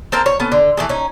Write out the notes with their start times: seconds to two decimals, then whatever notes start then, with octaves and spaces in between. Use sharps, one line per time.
0.12 C4 A4 A#4 C5
0.26 C#5
0.40 B3 C#4 A4
0.52 D3
0.77 E3 A3 G#4
0.89 C#4 D#4